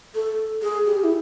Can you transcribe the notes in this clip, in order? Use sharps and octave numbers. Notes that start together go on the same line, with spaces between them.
A4
G#4
G4
E4